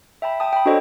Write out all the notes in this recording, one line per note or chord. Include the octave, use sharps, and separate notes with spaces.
E5 G5 A5 B5
G5 A5 D#6
G5 B5
D4 F#4 A4 C5 C#5 D#5